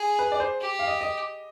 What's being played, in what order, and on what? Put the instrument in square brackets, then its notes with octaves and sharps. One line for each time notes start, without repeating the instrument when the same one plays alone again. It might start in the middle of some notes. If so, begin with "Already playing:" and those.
Already playing: [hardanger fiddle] G#4
[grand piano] B4
D5
C5
[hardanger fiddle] G4
[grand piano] F5
D#5
D#5